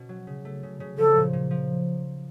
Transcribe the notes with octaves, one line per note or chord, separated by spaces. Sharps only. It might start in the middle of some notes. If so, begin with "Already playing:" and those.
Already playing: B2 C#4
F#3
C#3
A3
C#3
C#3
F3 A4
A#2
A#2
F3